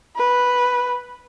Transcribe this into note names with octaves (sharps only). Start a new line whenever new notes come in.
B4